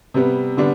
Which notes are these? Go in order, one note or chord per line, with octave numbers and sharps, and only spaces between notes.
C3 G3 B3
D3 G3 B3 D4